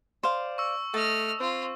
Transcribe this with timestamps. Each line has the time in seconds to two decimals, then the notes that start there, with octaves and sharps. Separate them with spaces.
0.23 C5 D5 F5
0.58 C#6 E6
0.94 A3 D#5 A5 F6
1.40 C4 F4